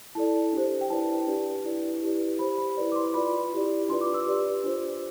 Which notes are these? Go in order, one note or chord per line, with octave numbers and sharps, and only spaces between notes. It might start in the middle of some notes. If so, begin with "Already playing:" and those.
E4 A4 D5 A5
D4 G4 C5
G5
E4 B4 D5 A5
D4 G4 B4 D5
E4 B4 D5
E4 G4 B4 D5
G4 C5 B5
B5
E4 B4 D5
D6
C6
F4 B4 D5 B5
E4 G4 D5
D4 F4 B4 D5 C6
D6
E6
G4 B4 D5
D4 F4 C5